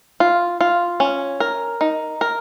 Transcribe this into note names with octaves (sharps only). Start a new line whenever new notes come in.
F4
F4
C#4
A#4
D#4
A#4